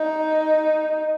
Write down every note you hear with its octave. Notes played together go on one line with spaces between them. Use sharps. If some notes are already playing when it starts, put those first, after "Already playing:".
Already playing: D#4